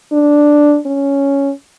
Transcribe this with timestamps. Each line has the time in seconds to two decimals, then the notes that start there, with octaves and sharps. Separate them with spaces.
0.12 D4
0.86 C#4